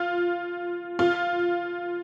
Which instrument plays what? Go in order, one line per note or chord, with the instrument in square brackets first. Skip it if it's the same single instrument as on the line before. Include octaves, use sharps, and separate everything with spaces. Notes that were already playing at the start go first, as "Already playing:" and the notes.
Already playing: [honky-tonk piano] F4
F4